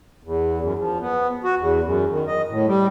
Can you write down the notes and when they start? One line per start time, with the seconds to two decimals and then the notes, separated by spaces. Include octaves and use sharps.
0.23 E2
0.61 F#2
0.78 F3
1.00 B3
1.44 F#4
1.58 E2
1.84 F#2
2.09 D#3
2.27 D#5
2.49 A2
2.67 G3